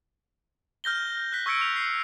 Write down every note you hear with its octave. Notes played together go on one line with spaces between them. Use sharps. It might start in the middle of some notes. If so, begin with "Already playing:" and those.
F6 G6 A#6 G7
F#6 B6
C#6 E6 G#6 C#7 D7
F7
C7